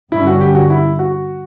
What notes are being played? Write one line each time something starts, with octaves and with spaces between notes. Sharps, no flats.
G2 D3 G3 C#4 E4
F#4
G4
F#4
E4
F#4